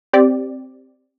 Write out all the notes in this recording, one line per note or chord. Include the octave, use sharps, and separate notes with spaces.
C4 G4 D5